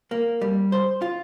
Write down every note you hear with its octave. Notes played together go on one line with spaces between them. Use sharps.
A#3
G3
C5
F4